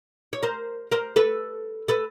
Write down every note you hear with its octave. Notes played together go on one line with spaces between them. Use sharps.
C#5
A#4 C5
A#4 C5
A4 B4
A4 B4